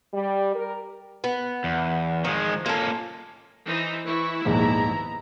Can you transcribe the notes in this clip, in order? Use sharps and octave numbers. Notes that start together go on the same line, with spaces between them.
G3
A#4
B3
E2
D#3 F3 G#3
A#3 C#4 F4 A4
E3 D#4 C5
E3 E4 C#6
A#1 D#2 G#2 B3 A#5